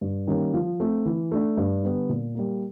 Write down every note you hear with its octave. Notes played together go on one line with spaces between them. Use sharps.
G2
D#3 G3 A#3 C#4
F3
A3 C4
E3
A3 D4
G2
D3 G3 B3
A#2
G3 A#3